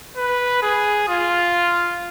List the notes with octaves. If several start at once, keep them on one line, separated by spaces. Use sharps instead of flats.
B4
G#4
F4